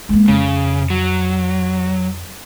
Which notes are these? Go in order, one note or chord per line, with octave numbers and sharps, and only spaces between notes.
G#3 A#3
F2 C#3
F#3